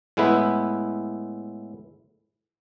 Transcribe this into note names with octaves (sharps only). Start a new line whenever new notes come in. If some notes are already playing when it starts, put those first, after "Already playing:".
A2 G#3 B3 E4 B4